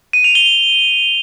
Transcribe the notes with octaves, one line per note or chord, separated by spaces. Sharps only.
D#7
F7
G7